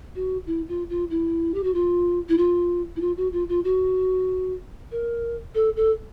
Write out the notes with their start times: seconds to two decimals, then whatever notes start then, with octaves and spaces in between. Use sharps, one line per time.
0.15 F#4
0.47 E4
0.68 F4
0.90 F4
1.10 E4
1.54 G4
1.63 F#4
1.74 F4
2.29 E4
2.37 F4
2.96 E4
3.01 F4
3.17 F#4
3.33 F4
3.49 F4
3.64 F#4
4.91 A#4
5.55 A4
5.76 A4